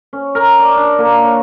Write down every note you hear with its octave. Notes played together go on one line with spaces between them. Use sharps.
C#4
A#4
D5
D4
A#3
C#5